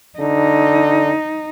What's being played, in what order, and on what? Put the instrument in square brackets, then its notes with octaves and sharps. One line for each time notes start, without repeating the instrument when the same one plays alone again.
[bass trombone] D3 [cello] D#4